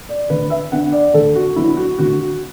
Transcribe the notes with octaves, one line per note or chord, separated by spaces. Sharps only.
D5
D2 B4
E5
D3 B3 D4 F#5
D5
D2 A4
F#4
D3 F#3 B3 E4
F#4
D2 F#4
F#4